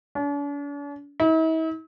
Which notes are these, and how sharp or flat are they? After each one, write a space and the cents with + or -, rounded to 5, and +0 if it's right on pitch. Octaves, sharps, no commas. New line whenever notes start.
D4 -45
E4 -45